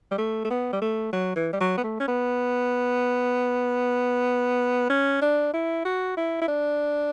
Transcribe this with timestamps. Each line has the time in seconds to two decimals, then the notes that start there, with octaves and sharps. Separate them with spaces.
0.11 G3
0.18 A3
0.45 A3
0.50 B3
0.73 G3
0.81 A3
1.13 F#3
1.36 E3
1.53 G3
1.61 F#3
1.78 B3
1.84 A3
2.00 C#4
2.08 B3
4.90 C#4
5.22 D4
5.53 E4
5.85 F#4
6.17 E4
6.42 E4
6.48 D4